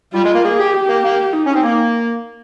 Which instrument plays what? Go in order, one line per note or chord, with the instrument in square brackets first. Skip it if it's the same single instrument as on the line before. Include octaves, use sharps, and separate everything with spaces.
[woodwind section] G3 [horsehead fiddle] F4
[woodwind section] G#3
A#3
[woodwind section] A#3 [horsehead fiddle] G#4
[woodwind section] G4
[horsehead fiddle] G4
[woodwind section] A#3
A#3
[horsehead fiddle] D#4
[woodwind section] C#4
C4
A#3